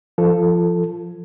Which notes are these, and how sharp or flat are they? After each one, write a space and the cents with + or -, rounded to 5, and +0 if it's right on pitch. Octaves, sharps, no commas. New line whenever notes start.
F3 -15 A4 +5